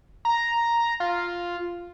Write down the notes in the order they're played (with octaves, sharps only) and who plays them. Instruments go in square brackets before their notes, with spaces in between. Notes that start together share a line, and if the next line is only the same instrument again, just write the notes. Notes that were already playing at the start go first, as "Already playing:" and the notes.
[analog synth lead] A#5
F4